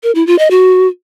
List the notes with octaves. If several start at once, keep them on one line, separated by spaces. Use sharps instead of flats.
A#4
E4
F4
D#5
F#4